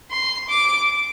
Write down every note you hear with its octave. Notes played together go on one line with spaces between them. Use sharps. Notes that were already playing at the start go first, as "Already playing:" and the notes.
C6
D6